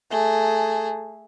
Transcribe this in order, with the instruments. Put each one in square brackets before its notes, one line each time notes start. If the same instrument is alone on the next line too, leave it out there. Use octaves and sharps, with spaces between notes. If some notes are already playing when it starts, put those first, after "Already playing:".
[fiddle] A3 G#4